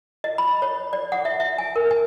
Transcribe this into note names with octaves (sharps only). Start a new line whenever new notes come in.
D#5
B5
C#5
D5
F#5
E5
E5
G#5
A#4
G#5